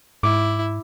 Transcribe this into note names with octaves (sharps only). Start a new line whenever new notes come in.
G#2 E4 D6